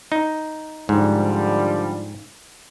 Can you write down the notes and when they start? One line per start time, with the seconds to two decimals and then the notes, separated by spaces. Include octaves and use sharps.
0.12 D#4
0.89 G#2 D3 F3 G3